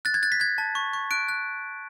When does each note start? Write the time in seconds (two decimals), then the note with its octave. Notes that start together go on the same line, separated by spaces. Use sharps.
0.05 F#6 A6
0.14 G#6
0.23 F#6 A6
0.32 B6
0.40 F#6 G#6
0.58 A5
0.75 C#6
0.93 C#6
1.11 F#6 D7
1.29 F#6